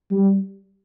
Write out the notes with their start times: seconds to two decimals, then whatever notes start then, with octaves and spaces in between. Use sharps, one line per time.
0.11 G3